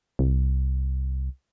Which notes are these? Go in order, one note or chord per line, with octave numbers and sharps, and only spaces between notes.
C2